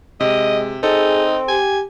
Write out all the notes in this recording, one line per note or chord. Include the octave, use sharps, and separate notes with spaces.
C3 G#3 D#5
C4 D#4 G#4 A4
G4 G#5